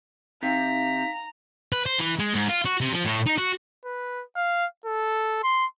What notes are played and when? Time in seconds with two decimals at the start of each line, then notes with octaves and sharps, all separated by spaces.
0.43 C3 D#4 F5 G5 A#5 B6
1.73 B4
1.86 C5
1.99 E3
2.20 G#3
2.34 G#2
2.49 F4
2.65 F#4
2.81 C3
2.93 F3
3.05 A2
3.26 D#4
3.38 F#4
3.85 B4
4.36 F5
4.86 A4
5.43 C6